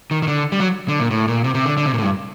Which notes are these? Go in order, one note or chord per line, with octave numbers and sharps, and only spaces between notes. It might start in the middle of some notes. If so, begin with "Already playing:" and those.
D#3
D#3
D3
G3
F#3
D3
A#2
A2
A#2
C3
C3
D3
D3
C3
A#2
A2
G2